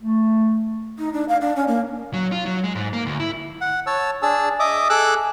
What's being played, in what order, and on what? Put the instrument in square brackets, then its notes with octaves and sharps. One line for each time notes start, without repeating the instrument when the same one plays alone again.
[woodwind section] A3
[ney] D#4
D4
F5
D4
C#4
A#3
[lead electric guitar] F#3
F4
F#3
G#3
G#2
A#3
D2
E4
[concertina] F#5
C#5 A5 E6
D4 G#4 A5 E6
D#5 E5 D6 D#6
G#4 A4 D6 E6 F#6